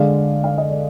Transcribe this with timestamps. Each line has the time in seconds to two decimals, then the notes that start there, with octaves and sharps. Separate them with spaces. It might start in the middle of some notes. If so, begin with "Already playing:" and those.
Already playing: D3 G#3 D5 F5
0.44 F5
0.58 D#5
0.71 D5